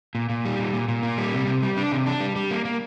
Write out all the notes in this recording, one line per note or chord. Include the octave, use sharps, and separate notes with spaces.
A#2
A#2
G3
A#2
A#2
A#2
A#3
G3
C3
C3
G3
D4
C3
D4
G3
G3
A#3
A#3